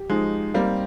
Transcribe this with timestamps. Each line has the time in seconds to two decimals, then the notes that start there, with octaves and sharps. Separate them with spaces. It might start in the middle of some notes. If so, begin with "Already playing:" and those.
Already playing: G4
0.09 F3 G#3 D#4
0.54 G3 A#3 C4